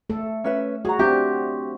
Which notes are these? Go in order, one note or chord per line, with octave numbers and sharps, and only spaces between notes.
A3 A4
C#4 B4 E5
F#4 G#4 A#5
C4 D4 G4 E5